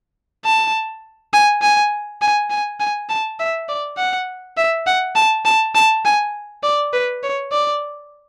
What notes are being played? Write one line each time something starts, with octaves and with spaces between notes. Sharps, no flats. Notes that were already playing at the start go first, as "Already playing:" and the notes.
A5
G#5
G#5
G#5
G#5
G#5
A5
E5
D5
F#5
E5
F#5
A5
A5
A5
G#5
D5
B4
C#5
D5